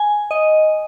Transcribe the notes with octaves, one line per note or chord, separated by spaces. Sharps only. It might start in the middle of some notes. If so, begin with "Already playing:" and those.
Already playing: G#5
D#5